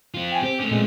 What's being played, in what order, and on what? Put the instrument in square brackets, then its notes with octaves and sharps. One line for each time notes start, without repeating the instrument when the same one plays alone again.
[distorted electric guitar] C4 F4
[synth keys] G5 G#5
[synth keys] C4 [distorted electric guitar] G4
[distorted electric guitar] A3 C#4
[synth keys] A#2 G#3 C4